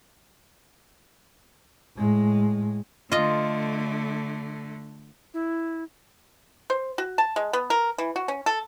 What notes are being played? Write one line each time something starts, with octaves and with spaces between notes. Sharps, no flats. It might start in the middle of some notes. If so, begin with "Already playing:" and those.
A2 G#3
D3 A3 F4 D#5
E4
C5
F#4
A5
G#3
B3
A#4
E3
F#4
C#4
A4